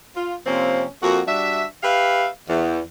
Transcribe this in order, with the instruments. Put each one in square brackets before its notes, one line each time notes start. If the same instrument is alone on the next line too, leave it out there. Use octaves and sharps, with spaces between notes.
[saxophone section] F4
C3 F3 A#3 C4 C#4
F2 A#3 F#4
G3 D4 F#4 E5
G4 B4 E5 F5
E2